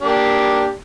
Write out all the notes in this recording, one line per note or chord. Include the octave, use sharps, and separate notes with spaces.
A#3 D4 G4